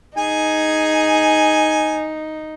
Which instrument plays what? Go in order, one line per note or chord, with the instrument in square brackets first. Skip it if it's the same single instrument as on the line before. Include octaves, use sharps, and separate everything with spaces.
[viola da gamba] D#4 [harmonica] G#4 G#5